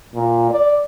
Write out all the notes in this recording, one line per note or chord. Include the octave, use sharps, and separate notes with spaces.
A#2
D5